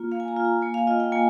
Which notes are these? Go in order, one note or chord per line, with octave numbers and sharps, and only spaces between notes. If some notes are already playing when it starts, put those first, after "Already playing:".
Already playing: A#3 F4
A#3 F5
G#5
A#5
F4
A#5
A#3 G#5
F5
F4 D#5
G5
A#3 G#5